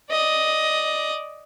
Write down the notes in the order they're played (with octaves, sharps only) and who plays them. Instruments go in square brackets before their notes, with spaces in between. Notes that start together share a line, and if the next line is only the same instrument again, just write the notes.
[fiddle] D5 D#5